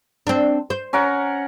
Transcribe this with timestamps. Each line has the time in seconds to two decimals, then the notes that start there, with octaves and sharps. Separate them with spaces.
0.27 C4 D4
0.70 C5
0.93 C#4 A#4 F#5